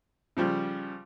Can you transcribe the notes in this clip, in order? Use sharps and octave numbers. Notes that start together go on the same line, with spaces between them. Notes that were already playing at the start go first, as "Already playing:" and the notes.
C#3 F3 G3